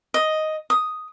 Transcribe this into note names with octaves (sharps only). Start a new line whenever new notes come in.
D#5
D#6